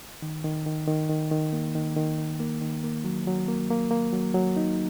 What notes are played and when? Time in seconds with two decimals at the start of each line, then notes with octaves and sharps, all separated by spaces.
0.22 D#3
0.45 D#3
0.66 D#3
0.88 D#3
1.09 D#3
1.31 D#3
1.53 A#3
1.75 D#3
1.96 D#3
2.18 D#3
2.40 A#3
2.62 D#3
2.84 A#3
3.04 F#3
3.27 F#3
3.48 A#3
3.70 A#3
3.91 A#3
4.13 F#3
4.34 F#3
4.57 D#4